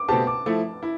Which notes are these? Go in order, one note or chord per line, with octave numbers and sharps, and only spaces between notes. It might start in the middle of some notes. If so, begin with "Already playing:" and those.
Already playing: D6
B2 A3 C4 G4 C5 A5
D6
F3 A3 E4
E4